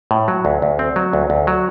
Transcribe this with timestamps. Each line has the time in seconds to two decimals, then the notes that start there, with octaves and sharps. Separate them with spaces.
0.11 A2
0.28 F#3
0.45 D2
0.62 D2
0.79 C4
0.96 F#3
1.13 D2
1.30 D2
1.47 F#3